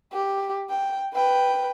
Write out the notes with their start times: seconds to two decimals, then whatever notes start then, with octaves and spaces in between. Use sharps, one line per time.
0.13 G4
0.70 G5
1.14 B4 G5